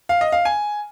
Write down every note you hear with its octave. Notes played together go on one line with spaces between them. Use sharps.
F5
D#5
F5
G#5